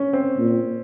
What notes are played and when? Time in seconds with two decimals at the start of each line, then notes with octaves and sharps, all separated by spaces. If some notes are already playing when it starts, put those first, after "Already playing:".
Already playing: C#4
0.13 C4
0.37 A#2